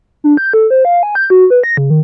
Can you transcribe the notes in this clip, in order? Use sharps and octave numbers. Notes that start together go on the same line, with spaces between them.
D4
G6
A4
C5
F5
G#5
G6
F#4
B4
A#6
C#3
D#3